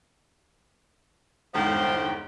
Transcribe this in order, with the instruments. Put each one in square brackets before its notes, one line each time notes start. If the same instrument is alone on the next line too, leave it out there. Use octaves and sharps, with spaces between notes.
[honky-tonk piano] G1 E2 G#2 [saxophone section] F3 C5 [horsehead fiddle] G5